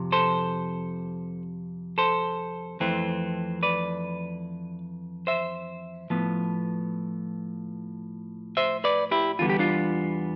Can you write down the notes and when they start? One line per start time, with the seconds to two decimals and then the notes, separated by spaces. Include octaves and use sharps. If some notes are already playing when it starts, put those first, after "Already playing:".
Already playing: F2 C3
0.12 A4 C5
1.98 A4 C5
2.80 F2 E3 A3 C4
3.63 B4 D5
5.27 C5 E5
6.10 A2 F3 B3
8.57 C5 E5
8.84 B4 D5
9.11 E4 G4
9.39 E2 D3 G3 B3 F4
9.50 G4
9.59 D4 F4